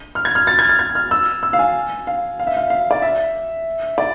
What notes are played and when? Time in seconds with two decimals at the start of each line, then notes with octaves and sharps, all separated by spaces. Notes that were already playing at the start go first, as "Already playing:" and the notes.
0.15 F6
0.25 G#6
0.35 F6
0.47 A6
0.59 G#6
0.69 F6
0.79 G#6
0.95 F6
1.11 E6
1.43 E6
1.53 F5
1.59 G#5
2.07 F5
2.39 F5
2.47 E5
2.57 F5
2.70 F5
2.91 D5
3.02 E5
3.98 D5